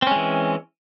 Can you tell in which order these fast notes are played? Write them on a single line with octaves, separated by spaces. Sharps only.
C4 C#4 G#3 E3